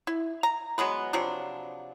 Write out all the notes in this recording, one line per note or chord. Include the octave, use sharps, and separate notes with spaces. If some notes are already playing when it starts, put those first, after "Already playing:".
E4
A#5
F#3 G#3 B3 B4
C3 F3 F#3 D4